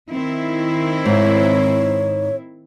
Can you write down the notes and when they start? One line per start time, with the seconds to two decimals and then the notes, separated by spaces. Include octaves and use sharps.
0.10 D#3 C4 E4
1.06 G#2 C#5